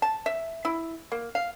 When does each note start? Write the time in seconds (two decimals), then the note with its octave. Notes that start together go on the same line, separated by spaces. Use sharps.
0.02 A5
0.26 E5
0.65 E4
1.12 A#3
1.35 F5